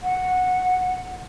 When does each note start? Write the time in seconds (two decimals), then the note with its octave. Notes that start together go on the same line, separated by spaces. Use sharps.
0.03 F#5